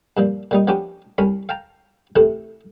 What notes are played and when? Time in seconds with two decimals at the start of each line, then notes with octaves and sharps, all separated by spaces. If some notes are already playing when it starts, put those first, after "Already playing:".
0.17 G2 A#2 F3
0.51 A#2 G3 D#4
0.67 F3 B3 C#4 D4 G4
1.18 C2 C#4 A#4 B5
1.49 F5 G5 A5 A#5
2.16 A2 C3 E3 A3